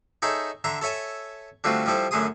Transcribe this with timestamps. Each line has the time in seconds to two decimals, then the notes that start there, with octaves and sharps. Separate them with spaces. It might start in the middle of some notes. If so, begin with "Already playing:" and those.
0.22 D#4 G#4 A4 C#5 E5 G5
0.64 D3 E5 A#5 C6
0.81 A4 C#5 E5 G#5 A5
1.64 D3 G3 A3 C4 F4 F#4
1.86 F3 G3 E4 A4 C5
2.11 F#2 D3 A3 G#4 C6 D#6